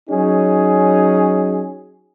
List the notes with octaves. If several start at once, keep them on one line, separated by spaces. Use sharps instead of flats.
F#3 C#4 D#4 G#4